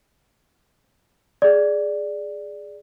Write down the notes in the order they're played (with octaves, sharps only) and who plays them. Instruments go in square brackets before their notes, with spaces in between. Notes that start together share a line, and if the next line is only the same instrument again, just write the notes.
[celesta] G#4 D5